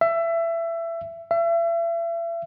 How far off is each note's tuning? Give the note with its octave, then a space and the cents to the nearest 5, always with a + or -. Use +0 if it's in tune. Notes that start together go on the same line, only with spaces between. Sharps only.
E5 +20
E5 +35